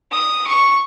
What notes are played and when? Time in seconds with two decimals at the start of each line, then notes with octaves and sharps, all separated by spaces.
0.12 D#6
0.47 C#6